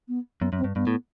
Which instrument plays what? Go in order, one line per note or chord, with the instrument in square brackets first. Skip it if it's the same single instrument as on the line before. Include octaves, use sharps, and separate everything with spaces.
[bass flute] B3
[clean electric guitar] F#2 [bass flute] B3
[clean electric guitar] F#2
[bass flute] C4
[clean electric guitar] G2
[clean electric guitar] G2 [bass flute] B3
[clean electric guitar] A2